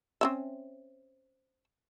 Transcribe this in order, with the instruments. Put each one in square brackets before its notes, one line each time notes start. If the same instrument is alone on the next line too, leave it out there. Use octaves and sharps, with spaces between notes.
[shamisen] C4 C#4 E5